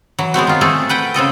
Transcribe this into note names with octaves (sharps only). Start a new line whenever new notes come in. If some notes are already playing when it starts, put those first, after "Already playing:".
E3 F#3
G#3 B3 C4 F#4
D#3 F4
A3 C4 G#4 A4
B4 F#5 G5
C#3 C4 A4 D#5